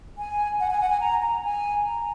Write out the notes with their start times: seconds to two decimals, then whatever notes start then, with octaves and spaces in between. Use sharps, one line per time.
0.18 G#5
0.60 F#5
0.70 G#5
0.81 F#5
0.90 G#5
1.01 A#5
1.22 A#5
1.43 G#5
1.85 A#5